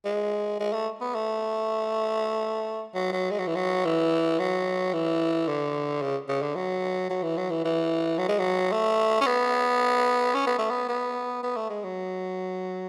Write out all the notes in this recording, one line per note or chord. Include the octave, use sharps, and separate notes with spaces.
G#3
G#3
A3
B3
A3
F#3
F#3
G#3
F#3
E3
F#3
E3
F#3
E3
D3
C#3
C#3
D3
F#3
F#3
E3
F#3
E3
E3
F#3
G#3
F#3
A3
C#4
B3
C#4
B3
A3
B3
B3
B3
A3
G#3
F#3